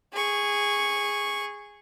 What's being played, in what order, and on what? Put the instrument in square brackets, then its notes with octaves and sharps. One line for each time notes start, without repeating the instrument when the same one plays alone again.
[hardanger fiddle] G#4 C#6